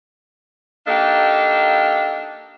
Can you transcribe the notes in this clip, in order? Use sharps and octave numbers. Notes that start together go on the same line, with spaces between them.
A#3 D4 D#4 G4 A4 F5